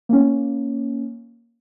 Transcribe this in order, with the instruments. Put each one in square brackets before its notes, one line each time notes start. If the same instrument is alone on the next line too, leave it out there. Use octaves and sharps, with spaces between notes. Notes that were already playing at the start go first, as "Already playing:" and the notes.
[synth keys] A#3 C#4